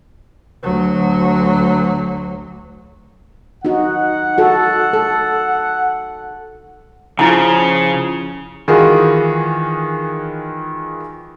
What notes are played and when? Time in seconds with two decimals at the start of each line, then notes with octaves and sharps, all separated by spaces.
0.63 D2 F#3
3.65 D#4 F#4 F#5
4.38 F#4 A4
4.93 A4
7.19 C#3 F3 E4 A5
8.68 D#3 E3 G#3 F4 F#4 G#4